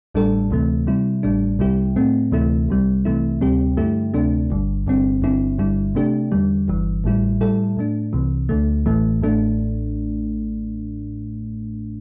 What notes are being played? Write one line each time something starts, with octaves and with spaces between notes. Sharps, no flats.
A1 A2 G3 D4 A4
D2 C3 E3 A3
C3 G3 E4
A1 A2 G3 D4
C2 C3 G3 E4 G4
A2 A3 C4
D2 C3 E3 A3 E4
C2 C3 G3
C2 C3 E3 A3 E4
D2 C3 G3 C4 G4
G2 D3 A3 E4 G4
D2 C3 A3 D4
G1 G2 D3
G1 G2 D3 C4
G1 G2 D3 C4 E4
G1 G2 D3 G3 E4
C3 A3 D4 G4
E2 D3 G3
G1 G2 E3
A1 A2 G3 E4
A2 G3 E4 A4
A2 A3 D4
C2 C3 E3
D2 D3 A3
A1 A2 E3 A3
A1 A2 A3 D4